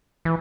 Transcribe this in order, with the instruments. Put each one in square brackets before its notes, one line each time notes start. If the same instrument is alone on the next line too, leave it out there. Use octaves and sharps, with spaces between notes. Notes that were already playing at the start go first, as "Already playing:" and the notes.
[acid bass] E3